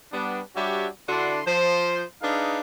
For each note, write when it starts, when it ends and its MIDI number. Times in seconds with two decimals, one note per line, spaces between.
0.12 0.41 55
0.12 0.41 59
0.12 0.41 62
0.55 0.87 55
0.55 0.87 62
0.55 0.87 66
0.55 0.87 67
0.55 0.87 73
0.55 0.87 76
1.08 1.40 50
1.08 1.40 62
1.08 1.40 64
1.08 1.40 66
1.08 1.40 84
1.45 2.03 53
1.45 2.03 72
2.22 2.60 62
2.22 2.60 63
2.22 2.60 68
2.22 2.60 71
2.22 2.60 77